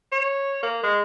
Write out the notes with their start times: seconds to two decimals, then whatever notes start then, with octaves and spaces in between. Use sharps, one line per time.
0.12 C#5
0.63 A#3
0.83 G#3